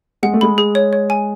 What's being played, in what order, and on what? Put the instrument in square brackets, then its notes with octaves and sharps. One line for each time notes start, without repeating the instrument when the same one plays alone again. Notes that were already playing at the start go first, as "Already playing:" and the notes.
[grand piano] G#3 [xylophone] F#5
[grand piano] A3
[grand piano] G#3 [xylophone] B5
[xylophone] G#4
C#5
C#5
G#5